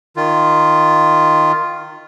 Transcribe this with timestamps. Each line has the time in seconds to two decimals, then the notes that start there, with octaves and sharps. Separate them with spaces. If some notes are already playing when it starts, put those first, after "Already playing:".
0.16 D#3 F4